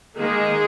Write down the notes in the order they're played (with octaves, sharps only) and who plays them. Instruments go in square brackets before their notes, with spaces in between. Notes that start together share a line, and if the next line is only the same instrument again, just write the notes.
[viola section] D#3 G#3 A#3 G#4